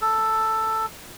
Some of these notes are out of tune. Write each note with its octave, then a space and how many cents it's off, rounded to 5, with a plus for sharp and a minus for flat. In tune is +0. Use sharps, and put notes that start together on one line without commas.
A4 +5